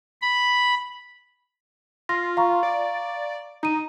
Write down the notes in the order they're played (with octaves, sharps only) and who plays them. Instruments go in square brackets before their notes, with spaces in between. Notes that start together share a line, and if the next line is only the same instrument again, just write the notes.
[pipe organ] B5
[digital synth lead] F4 [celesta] A#6
[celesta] F5 A#5 C#6
[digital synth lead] D5
[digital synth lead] D#4 [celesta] A#5 D#7